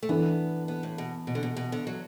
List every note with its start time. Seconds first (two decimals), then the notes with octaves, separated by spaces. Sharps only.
0.03 A3
0.09 E3 B3 D4 A4
0.68 B3
0.83 A2
0.98 B2
1.27 B2
1.35 D3
1.43 B2
1.57 B2
1.72 D3
1.87 F#3